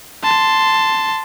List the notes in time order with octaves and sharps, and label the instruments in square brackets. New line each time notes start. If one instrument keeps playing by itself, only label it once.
[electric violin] A5 C6